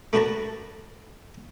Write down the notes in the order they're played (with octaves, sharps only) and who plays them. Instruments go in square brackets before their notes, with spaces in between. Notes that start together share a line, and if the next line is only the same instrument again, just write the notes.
[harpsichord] A3 D4 F#4 B4 A5 A#5